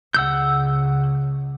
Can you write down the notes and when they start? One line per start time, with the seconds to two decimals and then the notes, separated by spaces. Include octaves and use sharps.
0.14 C#2 C#3 F#5 E6 G6